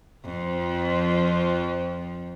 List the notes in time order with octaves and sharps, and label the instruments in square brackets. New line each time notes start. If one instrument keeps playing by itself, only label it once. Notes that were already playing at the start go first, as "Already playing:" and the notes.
[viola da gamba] F2 F3